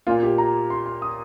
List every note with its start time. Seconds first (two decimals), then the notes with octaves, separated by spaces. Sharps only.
0.07 A#2 A#3 F4
0.23 G4
0.38 A#5
0.70 C6
0.86 C6
1.02 D#6